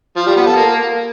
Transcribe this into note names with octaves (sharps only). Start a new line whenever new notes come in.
F3
G3
B3
A4
A#3